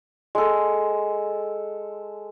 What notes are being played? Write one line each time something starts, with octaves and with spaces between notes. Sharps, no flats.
G#3 A4